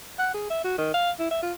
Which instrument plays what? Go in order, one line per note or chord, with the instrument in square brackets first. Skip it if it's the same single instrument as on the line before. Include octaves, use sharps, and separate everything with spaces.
[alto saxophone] F#5
G#4
E5
F#4
D#3
F5
E4
E5
F4